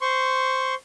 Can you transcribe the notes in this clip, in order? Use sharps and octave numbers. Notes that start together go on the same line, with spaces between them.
C5 C6 C#6